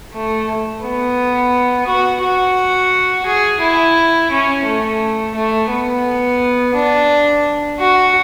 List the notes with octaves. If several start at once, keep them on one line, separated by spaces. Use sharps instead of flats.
A3
B3
F#4
F#4
G#4
E4
C#4
A3
A3
B3
D4
F#4